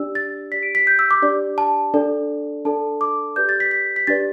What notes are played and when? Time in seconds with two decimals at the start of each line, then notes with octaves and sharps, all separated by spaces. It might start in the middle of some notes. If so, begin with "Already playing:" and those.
Already playing: D4 G4 D5 E6
0.15 A6
0.52 G4 D5 B6
0.63 D7
0.75 B6
0.87 G6
0.99 E6
1.11 D6
1.22 D4 G4 D5
1.58 A5
1.94 D4 A4 D5
2.65 D4 A4 D5 A5
3.01 D6
3.36 G4 B4 D5 G6
3.49 A6
3.60 B6
3.71 B6
3.96 B6
4.07 D4 G4 B4 D5 A6